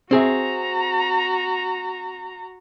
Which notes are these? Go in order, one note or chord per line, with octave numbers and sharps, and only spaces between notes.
C4 F#4 G#4 E5 A#5